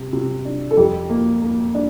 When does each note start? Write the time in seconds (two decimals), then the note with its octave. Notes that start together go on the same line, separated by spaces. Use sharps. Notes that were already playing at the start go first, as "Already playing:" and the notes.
Already playing: C3
0.13 C3
0.45 D4
0.71 A4
0.77 F2 G4
1.09 A#3
1.42 A#3
1.75 D4